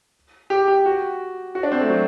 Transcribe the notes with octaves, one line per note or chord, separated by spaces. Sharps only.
G4
G4
F#4
F#4
D4
C4
A3
F#3